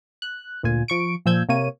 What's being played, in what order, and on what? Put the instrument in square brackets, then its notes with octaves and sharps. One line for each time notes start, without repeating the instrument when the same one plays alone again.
[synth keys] F#6
D2 A#2 F4 G#5
F3 C#6 D7
A#2 F3 E6 G6 G#6
C3 A#3 C#5 D#7